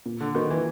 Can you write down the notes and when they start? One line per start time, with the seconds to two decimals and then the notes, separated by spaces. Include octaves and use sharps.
0.06 A#2
0.20 D3
0.35 D#3 F#3 A#3
0.50 E3